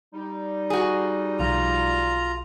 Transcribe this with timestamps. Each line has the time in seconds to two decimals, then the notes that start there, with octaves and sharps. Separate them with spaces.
0.14 G3 D#4
0.70 F#4 G#4
1.39 B1 F3 F4 A#5